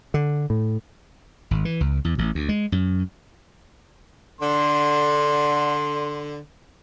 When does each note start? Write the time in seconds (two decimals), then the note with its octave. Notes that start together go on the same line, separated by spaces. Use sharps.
0.14 D3
0.50 A2
1.51 G#1
1.65 E3
1.81 C#2
2.04 E2
2.18 A1
2.35 D2
2.49 G#3
2.72 F#2
4.41 D3 C6